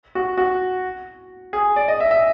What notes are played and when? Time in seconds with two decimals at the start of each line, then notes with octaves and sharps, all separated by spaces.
0.15 F#4
0.38 F#4
1.53 G#4
1.76 D5
1.88 D#5
2.00 E5
2.11 E5